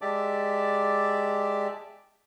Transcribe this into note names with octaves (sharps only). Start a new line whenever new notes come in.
G#3 G4 D5 E5 A5 D6